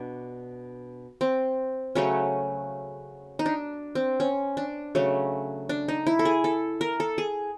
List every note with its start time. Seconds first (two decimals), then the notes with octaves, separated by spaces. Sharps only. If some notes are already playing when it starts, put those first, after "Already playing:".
Already playing: B2 D4
1.21 C4
1.95 C#3 F#3 A3 C#4
3.39 D#4
3.46 D4
3.95 C4
4.20 C#4
4.57 D4
4.95 C#3 F#3 A3
5.69 D4
5.88 D#4
6.07 E4
6.19 A4
6.25 G#4
6.44 A4
6.81 A#4
7.00 A4
7.18 G#4